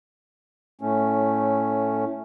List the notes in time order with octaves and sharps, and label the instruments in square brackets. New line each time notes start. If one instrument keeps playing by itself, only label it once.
[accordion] A2 A3 C#4